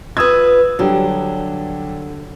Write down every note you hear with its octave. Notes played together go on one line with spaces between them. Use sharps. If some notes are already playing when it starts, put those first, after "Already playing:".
F4 B4 D#6 E6 G#6
D3 F#3 G3 G4